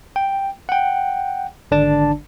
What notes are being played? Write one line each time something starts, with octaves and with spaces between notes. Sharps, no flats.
G5
F#5 G5
G#1 D3 D4 D5 A5